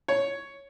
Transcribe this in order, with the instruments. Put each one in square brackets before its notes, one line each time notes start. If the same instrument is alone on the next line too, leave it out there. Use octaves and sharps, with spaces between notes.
[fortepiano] C#5